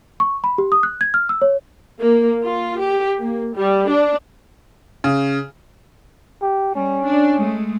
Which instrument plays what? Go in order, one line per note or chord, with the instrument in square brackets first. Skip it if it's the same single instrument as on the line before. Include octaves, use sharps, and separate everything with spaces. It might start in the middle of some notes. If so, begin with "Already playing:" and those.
[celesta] C#6
B5
G4
D#6
F#6
G#6
F6
E6
C#5
[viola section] A#3
F4
G4
A#3
G3
D4
[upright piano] C#3
[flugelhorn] G4
[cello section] G3 [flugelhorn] C#4
[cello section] D4
G#3 A3